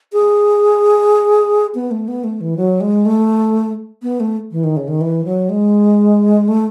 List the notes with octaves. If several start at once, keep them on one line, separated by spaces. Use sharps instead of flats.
G#4
B3
A3
B3
A3
E3
F#3
G#3
A3
B3
A3
E3
D#3
C#3
D#3
E3
F#3
G#3
A3